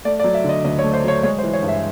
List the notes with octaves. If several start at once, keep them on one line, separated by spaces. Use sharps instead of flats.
A3 D5
D5
F#3
E5
D3 D#5
D2 D#5
C#5
A3
C5
F#3 C#5
G#3 C#5
C5
E3
C#5
G2
E5